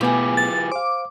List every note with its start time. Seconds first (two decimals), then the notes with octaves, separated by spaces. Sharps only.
0.01 B2 A3 B3 E4 F4 G4 G#4 B4
0.37 A6
0.72 C5 F5 D6